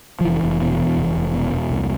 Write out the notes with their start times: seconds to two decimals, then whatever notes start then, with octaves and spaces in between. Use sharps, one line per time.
0.21 F3
0.25 F1 E3
0.43 F1
0.61 B2
0.79 E2
0.97 F1
1.16 F1
1.34 B2
1.52 E2
1.70 C2